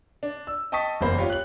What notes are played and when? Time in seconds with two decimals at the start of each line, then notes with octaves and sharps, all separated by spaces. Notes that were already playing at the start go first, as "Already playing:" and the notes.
0.23 D4
0.47 E6
0.72 D#5 G5 A5 C#6 D#6 B6
1.01 F#1 E2 A#3 C5 B5
1.18 F4 G4 C#5
1.30 F#6 F#7